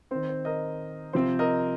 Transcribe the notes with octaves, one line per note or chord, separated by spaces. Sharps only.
D#3 C4 C5
C5
A#4 D#5
C3 F3 C4 C5
A#4 D#5